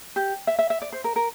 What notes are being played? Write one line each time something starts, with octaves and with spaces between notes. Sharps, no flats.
G4
E5
E5
E5
D5
C5
A#4
A#4